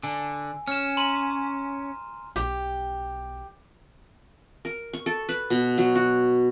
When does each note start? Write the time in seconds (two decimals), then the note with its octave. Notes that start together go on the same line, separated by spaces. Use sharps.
0.03 D3 G#5
0.68 C#4 F6 E7
0.97 A#5 C6 D#7
2.36 B1 G4
4.65 A#4
4.93 C#6
5.06 A4
5.29 B4
5.50 B2
5.78 F#3
5.95 F#4